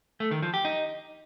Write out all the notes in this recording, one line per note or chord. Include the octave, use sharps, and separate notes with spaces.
A3
D#3
F3
G4
D#4